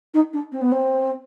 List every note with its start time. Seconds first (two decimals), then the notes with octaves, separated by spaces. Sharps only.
0.13 D#4
0.33 D4
0.52 C4
0.61 B3
0.71 C4